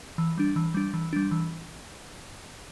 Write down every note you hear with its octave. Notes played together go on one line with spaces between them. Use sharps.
E3
G3 D4
E3
G3 D4
E3
G3 D4
E3